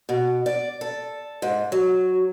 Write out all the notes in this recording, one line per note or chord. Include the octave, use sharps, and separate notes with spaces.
B2
D5
A4
G#2
F#3